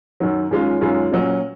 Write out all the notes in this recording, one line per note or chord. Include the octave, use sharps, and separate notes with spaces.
F#2 D#3 F#3
F#2 D#3 G#3 C#4 F4
F#2 D#3 G#3 C#4 F4
A#2 F#3 C#4